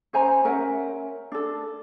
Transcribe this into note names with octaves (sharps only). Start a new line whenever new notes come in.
C#4 C5 G#5 A#5
C#4 A#4 E5 F#5
D4 A4